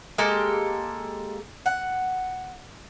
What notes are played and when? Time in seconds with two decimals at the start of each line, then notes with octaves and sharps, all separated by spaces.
0.18 G#3 A#3 G4 A4
1.66 F#5